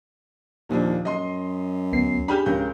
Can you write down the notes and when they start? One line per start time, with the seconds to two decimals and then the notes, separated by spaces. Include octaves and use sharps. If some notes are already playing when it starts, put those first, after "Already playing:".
0.69 D#2 A#2 F3 D4
1.05 F#2 D#5 C6
1.93 D2 B3 C7
2.28 D4 G4 G#4 B5 F6 G6
2.46 C#2 C#3 A#4 G6